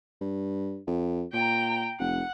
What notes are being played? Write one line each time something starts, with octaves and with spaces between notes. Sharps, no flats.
G2
F2
A#2 G5 A#5
F1 F#5